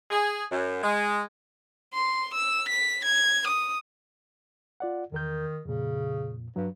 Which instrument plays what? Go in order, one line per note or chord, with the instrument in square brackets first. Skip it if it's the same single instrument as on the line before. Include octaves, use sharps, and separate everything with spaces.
[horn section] G#4
F#2
G#3
[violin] C6
E6
B6
G#6
D#6
[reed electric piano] F4 D5 F#5
[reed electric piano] E2 A#4 G6 [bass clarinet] D#3
[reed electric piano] F2 A#2 [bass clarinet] C#3
[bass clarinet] G2 [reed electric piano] F#3